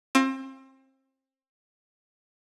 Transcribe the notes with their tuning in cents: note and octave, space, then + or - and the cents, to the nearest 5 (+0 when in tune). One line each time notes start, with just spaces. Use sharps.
C4 +30 F4 +0